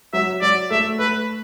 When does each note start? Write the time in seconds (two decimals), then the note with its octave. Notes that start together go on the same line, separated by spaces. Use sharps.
0.13 F#3 E5
0.41 F#3 D5
0.71 A3 E5
0.99 A3 B4